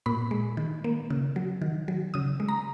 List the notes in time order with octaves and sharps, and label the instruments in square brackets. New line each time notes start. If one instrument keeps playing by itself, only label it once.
[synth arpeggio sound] A#2 B5
G#3
D#3
A#3
C#3
F#3
D#3
F#3
C#3 D#6
G#3
A#5